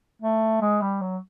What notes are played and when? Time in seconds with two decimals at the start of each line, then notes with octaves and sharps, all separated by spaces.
0.22 A3
0.61 G#3
0.81 G3
1.01 F#3